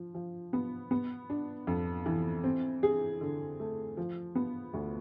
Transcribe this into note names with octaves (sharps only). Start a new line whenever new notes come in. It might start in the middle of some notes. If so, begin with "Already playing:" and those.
Already playing: F3
F3
B3
B3
D4
F2
E3
C4
G#4
D3
A3
F3
B3
D2